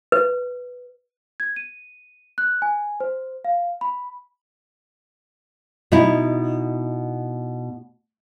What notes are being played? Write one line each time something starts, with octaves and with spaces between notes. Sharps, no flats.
B4
G#6
D#7
F#6
G#5
C5
F5
B5
B2 D#4 E4